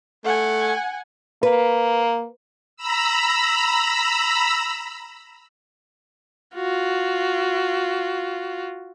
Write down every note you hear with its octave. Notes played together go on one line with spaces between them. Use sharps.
A3 F#5 G#5
A#3 B4
A#5 B5 E6
F4 F#4